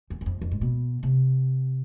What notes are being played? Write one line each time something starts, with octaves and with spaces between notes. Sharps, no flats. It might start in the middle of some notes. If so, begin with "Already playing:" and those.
E2
E2
F2
F2
G#2
B2
C3